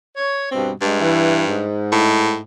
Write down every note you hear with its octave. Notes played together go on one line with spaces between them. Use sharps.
C#5
G2 B2 C4
G2 G#3
E3
G#2
A2